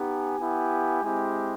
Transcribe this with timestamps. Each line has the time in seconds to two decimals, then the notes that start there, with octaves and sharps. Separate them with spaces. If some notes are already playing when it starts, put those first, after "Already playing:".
Already playing: B3 D#4 G4
0.08 G#5
0.39 B3 E4 G4
1.03 G#3 C4 E4 G4